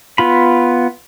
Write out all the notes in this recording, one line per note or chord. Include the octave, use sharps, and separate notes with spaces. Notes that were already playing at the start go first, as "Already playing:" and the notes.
B3 F4 B5